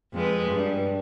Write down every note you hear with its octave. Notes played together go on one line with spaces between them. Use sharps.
F2 G#3 B4
G2